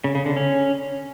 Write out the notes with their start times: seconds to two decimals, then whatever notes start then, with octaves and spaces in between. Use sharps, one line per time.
0.04 C#3
0.15 C#3
0.26 D3
0.36 C#4